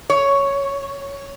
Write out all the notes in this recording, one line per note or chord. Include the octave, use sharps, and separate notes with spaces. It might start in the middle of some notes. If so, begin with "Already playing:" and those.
C#5